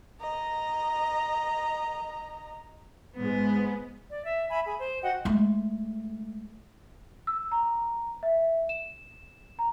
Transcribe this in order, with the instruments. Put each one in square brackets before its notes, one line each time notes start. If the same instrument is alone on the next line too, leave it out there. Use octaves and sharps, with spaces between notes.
[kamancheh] D#5 A#5
[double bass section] G#2 G#3 [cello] B3
[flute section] D5
E5
E5 G#5 B5
G#4 B5
C5
F#4 D#5 F#5 G5
[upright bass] G#3 A3
[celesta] E6
A#5
E5
E7
A#5